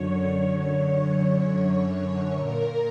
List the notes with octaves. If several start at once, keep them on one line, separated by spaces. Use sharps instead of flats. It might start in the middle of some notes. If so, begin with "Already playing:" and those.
Already playing: F#2 D3 C#5
C#5
A#2 A#4